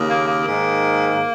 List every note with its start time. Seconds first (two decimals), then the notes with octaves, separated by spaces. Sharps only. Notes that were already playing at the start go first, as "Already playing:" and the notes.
Already playing: D#2 C#3
0.10 A#3
0.28 A#3
0.47 G#2 D#3